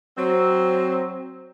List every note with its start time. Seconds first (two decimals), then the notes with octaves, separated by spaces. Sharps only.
0.17 F#3 C4